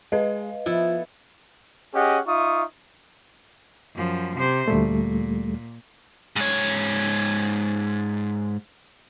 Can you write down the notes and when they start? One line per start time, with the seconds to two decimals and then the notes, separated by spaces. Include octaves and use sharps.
0.12 G#3 B4 D#5 F5
0.66 F3 B3 E4 A4
1.93 C#4 G4 G#4 D#5 F#5
2.26 D#4 F4 E5 C#6 D#6
3.95 F#2 F3
4.37 C3 C5
4.68 D2 A#2 G3 A3
6.36 G#2 C#5